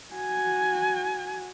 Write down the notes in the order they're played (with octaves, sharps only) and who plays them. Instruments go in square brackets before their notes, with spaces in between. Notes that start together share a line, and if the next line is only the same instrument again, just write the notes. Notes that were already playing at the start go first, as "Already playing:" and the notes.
[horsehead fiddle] F#4 G#5